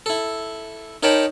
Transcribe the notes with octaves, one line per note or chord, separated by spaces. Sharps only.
E4 A4
D#4 A#4 C#5 G5 A5 B5